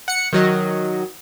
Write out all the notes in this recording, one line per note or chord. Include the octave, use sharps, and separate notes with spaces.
F#5 C#7
D#3 F#3 D#5